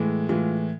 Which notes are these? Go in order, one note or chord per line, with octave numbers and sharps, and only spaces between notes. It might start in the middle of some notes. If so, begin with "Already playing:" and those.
Already playing: A2 E3 G#3
A2 E3 G#3 F4